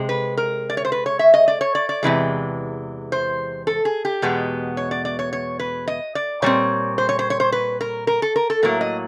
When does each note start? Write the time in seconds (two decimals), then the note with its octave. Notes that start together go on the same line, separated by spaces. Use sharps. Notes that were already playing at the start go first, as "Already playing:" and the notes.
Already playing: C3 G#3
0.09 B4
0.37 A#4
0.70 D5
0.77 C#5
0.85 C5
0.92 B4
1.06 C#5
1.19 E5
1.34 D#5
1.48 D5
1.61 C#5
1.75 D5
1.89 D5
2.03 E2 C3 E3 G#3
3.12 C5
3.67 A4
3.85 G#4
4.05 G4
4.22 E2 B2 G#3 B3
4.77 C#5
4.91 D5
5.05 D5
5.19 C#5
5.33 C#5
5.59 B4
5.88 D#5
6.15 D5
6.42 A#2 G3 C4 C#5
6.98 C5
7.09 C#5
7.19 C5
7.30 C#5
7.40 C5
7.52 B4
7.81 A#4
8.07 A#4
8.22 A4
8.36 A#4
8.50 A4
8.63 A2 F#3 A#3 A#4
8.81 D#5